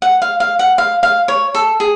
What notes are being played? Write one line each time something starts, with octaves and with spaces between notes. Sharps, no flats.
F#5
F5
F5
F#5
F5
F5
C#5
A4
G#4